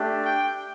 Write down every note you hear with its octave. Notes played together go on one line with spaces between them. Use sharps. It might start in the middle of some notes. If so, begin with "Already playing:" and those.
Already playing: A3 D4 G4
G5